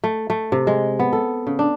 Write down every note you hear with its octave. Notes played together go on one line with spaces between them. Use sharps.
A3
A3
C3
G#3
B3
A4
C#3
D4